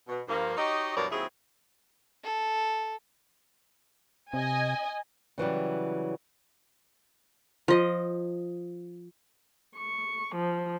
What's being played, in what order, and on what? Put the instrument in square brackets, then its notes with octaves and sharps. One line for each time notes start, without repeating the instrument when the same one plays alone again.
[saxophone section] B2
G2 F3 A#3
D#4 F#4 G4 C#5 D#5
G2 B2 E3 F#3 A#4 D5
D#2 F#3 C4 E4 G#4
[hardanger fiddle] A4
[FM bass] C3 [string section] D#5 G#5
[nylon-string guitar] C#3 E3 F#3 G3
[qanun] F3 D#5
[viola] C#6
F3